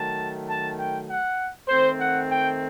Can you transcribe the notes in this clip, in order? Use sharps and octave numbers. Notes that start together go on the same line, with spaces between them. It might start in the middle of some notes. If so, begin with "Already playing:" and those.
Already playing: D#3 F#3 A3 A5
A5
G5
F#5
D#3 A3 C4 C5
F#5
G5